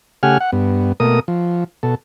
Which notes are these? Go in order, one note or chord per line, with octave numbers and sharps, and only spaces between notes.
C#3 A3 G4 F#5 G#5 F6
F#5
G2 B3
B2 A3 A#3 A#4 D#6
F3
B2 A4